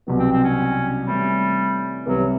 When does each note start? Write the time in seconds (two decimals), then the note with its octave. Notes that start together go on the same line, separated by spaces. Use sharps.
0.07 C2 B2 F#3 B3
0.19 C4
0.32 C4
0.44 C#4
1.07 C3 E3 G3 A3 C#4
2.06 C2 C3 E3 F#3 G3 B3